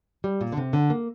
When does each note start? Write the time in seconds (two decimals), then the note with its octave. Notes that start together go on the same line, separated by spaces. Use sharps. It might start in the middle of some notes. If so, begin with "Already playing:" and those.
0.24 G3
0.41 A#2
0.52 D3
0.57 C3
0.73 D3
0.90 A#3